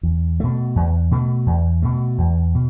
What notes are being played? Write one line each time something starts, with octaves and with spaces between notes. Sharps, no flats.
E2
B2 A3
E2
B2 A3
E2
B2 A3
E2
B2